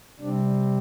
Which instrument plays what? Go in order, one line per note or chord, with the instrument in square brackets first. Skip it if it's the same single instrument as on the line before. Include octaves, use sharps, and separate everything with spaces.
[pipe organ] C3 G3 C4 D4